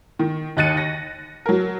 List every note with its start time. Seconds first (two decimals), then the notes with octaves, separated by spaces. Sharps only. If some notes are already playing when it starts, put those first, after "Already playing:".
0.19 D#3
0.57 D#2 D#5 F#6 A6 C#7 D#7
0.77 A#6
1.46 F#3 A#4